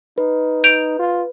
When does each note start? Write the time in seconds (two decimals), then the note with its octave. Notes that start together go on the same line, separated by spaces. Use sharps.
0.18 D#4 B4
0.64 G6 D7 F7
0.99 F4